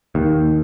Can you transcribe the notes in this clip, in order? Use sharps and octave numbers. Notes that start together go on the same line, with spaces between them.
D#2